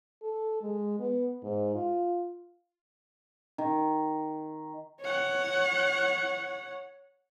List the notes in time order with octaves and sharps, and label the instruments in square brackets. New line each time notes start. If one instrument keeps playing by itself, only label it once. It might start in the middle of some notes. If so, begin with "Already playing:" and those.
[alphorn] A4
G#3
B3
G#2
F4
[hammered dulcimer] D#3
[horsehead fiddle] C#5 F#5